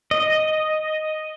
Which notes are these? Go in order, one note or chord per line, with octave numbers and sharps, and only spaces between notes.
D#5